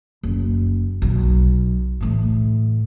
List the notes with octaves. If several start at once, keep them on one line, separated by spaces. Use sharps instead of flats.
F#1
B1
A2 E3